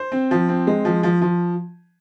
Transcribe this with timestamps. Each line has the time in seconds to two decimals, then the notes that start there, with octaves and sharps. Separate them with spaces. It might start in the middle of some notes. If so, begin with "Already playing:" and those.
Already playing: C5
0.12 C4
0.31 F3
0.49 C4
0.67 G#3
0.85 F3
1.03 F3
1.22 F3